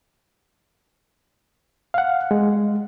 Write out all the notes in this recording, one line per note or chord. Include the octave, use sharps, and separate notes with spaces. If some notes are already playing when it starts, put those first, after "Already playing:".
F5 F#5
G#3